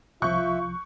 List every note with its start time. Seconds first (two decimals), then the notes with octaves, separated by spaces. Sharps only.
0.22 C2 F3 F4 E5 C#6 F#6 G6